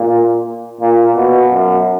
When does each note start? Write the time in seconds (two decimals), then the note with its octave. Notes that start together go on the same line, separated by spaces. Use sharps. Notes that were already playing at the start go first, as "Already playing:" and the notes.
Already playing: A#2
0.80 A#2
1.16 B2
1.51 F#2